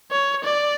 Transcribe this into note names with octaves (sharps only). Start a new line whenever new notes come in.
C#5
D5